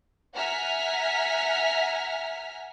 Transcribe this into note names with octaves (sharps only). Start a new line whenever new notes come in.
E5 F#5 G#5 A#5 F6 B6